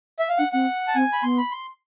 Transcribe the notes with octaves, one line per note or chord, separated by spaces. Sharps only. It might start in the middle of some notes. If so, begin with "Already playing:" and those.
E5
F5
D4 F#5
C4 F#5
A5
C4 G#5
B5
B3 C6
B5
C6